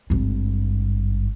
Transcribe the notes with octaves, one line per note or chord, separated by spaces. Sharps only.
G#1 G2